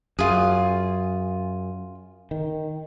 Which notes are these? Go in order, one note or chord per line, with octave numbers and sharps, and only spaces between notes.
F#2 F4 G#4
D#3